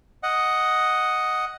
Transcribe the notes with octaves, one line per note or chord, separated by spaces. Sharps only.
D#5 F#5